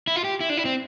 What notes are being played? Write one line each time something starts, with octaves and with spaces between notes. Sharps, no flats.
E4
F4
G4
E4
D4
E4
C4